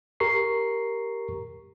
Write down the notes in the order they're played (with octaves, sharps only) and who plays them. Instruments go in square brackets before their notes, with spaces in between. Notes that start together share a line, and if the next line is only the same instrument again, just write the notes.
[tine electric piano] G4 A#4 A#5 C#6 C7